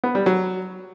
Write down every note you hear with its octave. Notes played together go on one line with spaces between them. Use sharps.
B3
G3
F#3